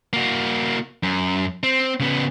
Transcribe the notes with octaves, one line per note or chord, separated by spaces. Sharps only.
A#3 F#4
F#2
C4
C#3 B3